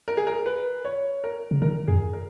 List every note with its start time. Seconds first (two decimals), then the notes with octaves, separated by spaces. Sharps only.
0.08 A#4
0.17 G#4
0.27 A#4
0.46 B4
0.85 C#5
1.24 A#4
1.51 C#3
1.62 D#3 A#4
1.88 F#2 G#4
2.13 A#4